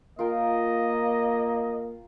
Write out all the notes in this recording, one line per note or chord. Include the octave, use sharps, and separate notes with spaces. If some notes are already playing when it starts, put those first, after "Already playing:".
A#3 F4 A#4 D#5 G5